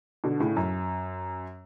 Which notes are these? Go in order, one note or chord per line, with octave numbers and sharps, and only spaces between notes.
B2 D3
A2 C#3
F#2